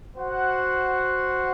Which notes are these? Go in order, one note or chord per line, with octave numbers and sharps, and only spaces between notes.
F#4 C5 F#5